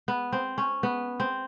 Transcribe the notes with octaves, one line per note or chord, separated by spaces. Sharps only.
B3
C4
C#4
B3
C4